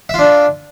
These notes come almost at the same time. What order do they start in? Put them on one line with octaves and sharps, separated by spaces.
E5 F4 D4